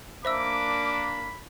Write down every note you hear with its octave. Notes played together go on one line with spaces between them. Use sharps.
A#3 D4 C5 E5 B5 D6 E6